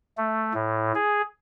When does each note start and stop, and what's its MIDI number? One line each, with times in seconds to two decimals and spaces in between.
0.18 0.53 57
0.54 0.92 45
0.95 1.22 68